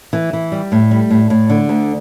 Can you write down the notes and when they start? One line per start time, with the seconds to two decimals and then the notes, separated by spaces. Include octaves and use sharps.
0.13 E3
0.33 E3
0.52 G3
0.72 A2
0.91 G3
1.11 A2
1.30 A2
1.50 D3
1.69 D2